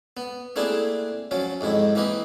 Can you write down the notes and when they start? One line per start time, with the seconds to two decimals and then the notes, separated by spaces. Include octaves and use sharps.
0.17 B3
0.56 A3 A#3 C4 D4 E4 G#4
1.31 F3 F#3 C#4
1.61 F2 G#2 D#3 E4
1.95 E3 A#3 C4 B4 D#5